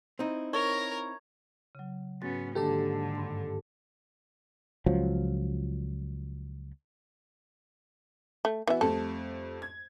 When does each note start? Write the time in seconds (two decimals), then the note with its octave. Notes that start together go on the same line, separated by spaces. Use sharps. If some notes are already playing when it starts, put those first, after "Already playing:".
0.19 C4 D#4 E4
0.53 A#4 C#5 A#5
1.75 C#3 F#3
2.22 G#2 B3 C#4 F#4 A6
2.55 G#2 D3 D#3 A#3 D4 G4 A4 A5
3.15 G2 C6
4.86 C#2 F3 F#3
8.45 A3
8.67 E3 B3 F#4 E5
8.81 F2 G3 A3 A4
9.62 G#6